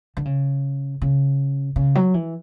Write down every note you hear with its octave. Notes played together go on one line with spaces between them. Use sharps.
D3
C#3
C#3
C#3
F#3
E3